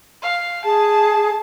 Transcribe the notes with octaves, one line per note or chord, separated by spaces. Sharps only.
F5
G#4 A5